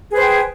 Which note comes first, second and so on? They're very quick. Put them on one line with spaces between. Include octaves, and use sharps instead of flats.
G#4 B4 C5 G5